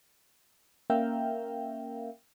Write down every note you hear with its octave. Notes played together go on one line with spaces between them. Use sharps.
A#3 C#4 A#4 E5 F5 G5